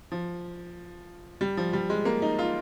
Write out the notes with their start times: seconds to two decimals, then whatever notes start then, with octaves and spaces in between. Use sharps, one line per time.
0.12 F3
1.41 G3
1.57 F3
1.73 G3
1.90 G#3
2.05 A#3
2.22 D#4
2.39 F4